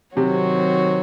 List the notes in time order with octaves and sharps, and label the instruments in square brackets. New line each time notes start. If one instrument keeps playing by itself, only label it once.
[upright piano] C3 [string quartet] D#3 F#3 C4 F#4 C#5